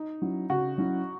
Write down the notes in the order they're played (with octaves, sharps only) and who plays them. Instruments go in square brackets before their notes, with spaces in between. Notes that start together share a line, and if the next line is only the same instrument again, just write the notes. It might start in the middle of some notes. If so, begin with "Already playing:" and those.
Already playing: [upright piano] D#4
[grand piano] F#3 C#4 E4
[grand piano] C#3 [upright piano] F#4
[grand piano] F#3 C#4 E4